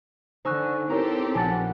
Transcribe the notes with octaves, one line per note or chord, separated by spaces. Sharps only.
D3 D#4 C5 G#5 C#6 E6 F#6
C4 E4 G4 A4 A#4 C#5 A#5
A#1 F#5 G#5 A5 A6